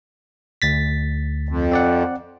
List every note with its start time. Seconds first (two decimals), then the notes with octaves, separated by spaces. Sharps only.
0.62 D2 A6 B6
1.49 F2
1.72 C4 D5 F#5